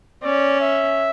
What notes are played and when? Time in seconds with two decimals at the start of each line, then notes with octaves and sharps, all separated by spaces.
0.23 C#4 D5
0.61 E5